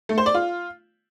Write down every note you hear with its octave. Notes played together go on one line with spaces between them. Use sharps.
A3
C5
D5
F4